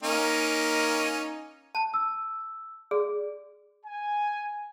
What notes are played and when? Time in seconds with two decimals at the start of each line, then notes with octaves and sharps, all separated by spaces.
0.03 A#3 C#4 D#4
1.75 A5
1.94 E6
2.91 G#4 D5
3.86 G#5